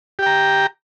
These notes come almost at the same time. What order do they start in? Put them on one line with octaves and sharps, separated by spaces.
G4 G5 A#5